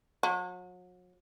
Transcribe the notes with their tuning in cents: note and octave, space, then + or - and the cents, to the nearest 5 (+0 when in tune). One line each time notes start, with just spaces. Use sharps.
F#3 -40